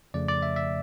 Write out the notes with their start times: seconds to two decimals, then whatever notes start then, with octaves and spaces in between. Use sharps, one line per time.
0.14 F2 C#3 F3 A3 D5
0.28 D5
0.42 E5
0.56 E5